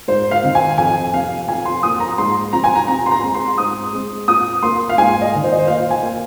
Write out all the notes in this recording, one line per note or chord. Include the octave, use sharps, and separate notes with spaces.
G#2 C5
F5
D#3 C4
G#5
F2 G#5
C3 F3 F5
F2 G#5
C6
F3 A#3 D#6
A#5
G#2 C6
F3 C4 A#5
G#5
A#5
C3 A#5
C6
A#5
G#3 C4
C6
G#2 D#6
G#3 C4
A#2 D#6
A#3 C6
F5
G#2 G#5
D#5
D#3 A#3
C5
D#5
C5
A#2 F5
G#5
A#3